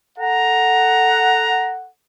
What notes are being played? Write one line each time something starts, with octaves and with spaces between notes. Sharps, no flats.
A4 F#5 A#5